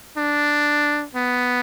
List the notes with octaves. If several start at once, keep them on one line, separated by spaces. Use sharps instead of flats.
D4
B3